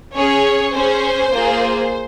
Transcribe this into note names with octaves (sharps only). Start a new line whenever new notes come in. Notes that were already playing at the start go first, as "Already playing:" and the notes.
C#4 G#4 C#5
C#4 G#4 C5
A#3 F4 G#4